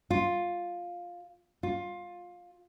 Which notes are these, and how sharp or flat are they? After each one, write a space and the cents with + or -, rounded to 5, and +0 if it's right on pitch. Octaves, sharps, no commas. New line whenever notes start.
F4 +10
F4 +20